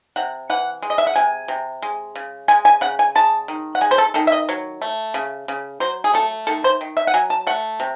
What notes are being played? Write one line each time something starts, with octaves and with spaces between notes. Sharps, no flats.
C3 F#5
E3 F#5
G#3
D#5
E5
F#5
C3 G#5
C3
G#3
C#3
G#3 G#5
G#5
C#3 F#5
G#5
G#3 A5
D#3
F#5
G#3 G#5
C5
A4
D#3 A4
E5
D#5
F#3 C#5
A3
C#3
C#3
F#3 C5
G#4
A3 A4
D#3 A4
C5
D#3
E5
F#5
F#3 G#5
A5
A3 F#5
C3